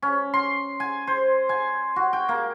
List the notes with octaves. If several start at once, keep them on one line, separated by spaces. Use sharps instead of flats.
C#4
C6
G#5
C5
G#5
F#4
G5
A#3